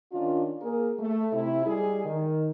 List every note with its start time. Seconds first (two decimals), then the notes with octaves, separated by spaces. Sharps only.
0.12 D#3 C#4 D4 F4
0.61 A#3 G#4 A#4
0.99 A3
1.33 C3 E4
1.65 G3 G#3 G#4
2.05 D#3